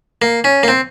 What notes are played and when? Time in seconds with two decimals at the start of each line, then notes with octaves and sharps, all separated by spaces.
0.22 A#3
0.44 C#4
0.63 A#3
0.68 C4